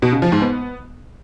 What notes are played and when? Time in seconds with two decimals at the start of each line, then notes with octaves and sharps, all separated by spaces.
0.02 B2
0.12 C#3
0.22 F3
0.32 G#2
0.42 B3